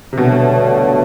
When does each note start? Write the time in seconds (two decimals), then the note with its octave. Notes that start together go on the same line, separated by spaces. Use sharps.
0.13 C3
0.17 G2 B2 D3 F#3 A3